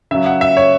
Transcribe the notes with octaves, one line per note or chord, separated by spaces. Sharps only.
C#3 F#3 E5
F#5
E5
C#5